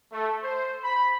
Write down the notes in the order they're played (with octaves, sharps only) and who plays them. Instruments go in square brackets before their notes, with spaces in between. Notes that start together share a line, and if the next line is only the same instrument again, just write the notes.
[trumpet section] A3
C5
B5